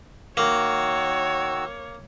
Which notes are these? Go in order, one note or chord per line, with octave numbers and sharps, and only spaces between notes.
D#3 A#3 F#4 C#5 E6